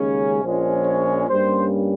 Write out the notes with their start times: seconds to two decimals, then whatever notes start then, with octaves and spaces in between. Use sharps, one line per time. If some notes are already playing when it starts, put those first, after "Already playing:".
Already playing: D#2 C#3 G#3 C#4
0.43 A#1 A#2 F3 G#3 C#4
0.86 C#5
1.28 G2 G3 A#3 C#4 C5